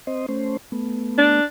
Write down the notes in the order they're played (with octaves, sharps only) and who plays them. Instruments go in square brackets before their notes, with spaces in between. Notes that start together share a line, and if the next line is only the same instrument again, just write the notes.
[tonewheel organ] C4 C5 D#5
A3 C#4 C5
A3 B3
[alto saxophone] D4